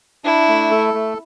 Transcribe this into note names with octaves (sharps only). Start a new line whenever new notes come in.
D4 E4
A3
A4
A3